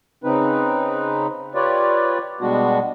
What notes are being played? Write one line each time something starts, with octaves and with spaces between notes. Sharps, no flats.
C#3 C4 D#4 B4
F4 G4 B4 C#5 D5
B2 G3 G#3 B3 D4 F#4